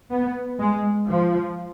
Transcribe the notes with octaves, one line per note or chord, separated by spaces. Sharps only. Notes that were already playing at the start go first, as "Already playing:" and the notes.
B3
G#3
F3